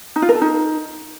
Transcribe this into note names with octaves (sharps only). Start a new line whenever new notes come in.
D#4
F4
A#4
A4
D#4